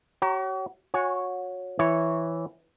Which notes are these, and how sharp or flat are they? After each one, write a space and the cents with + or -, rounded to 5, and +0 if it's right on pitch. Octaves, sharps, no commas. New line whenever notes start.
F#4 +45 C#5 +0 A#5 +0
F#4 -25 C#5 +0 G#5 -10
E3 +0 E4 +0 C#5 -5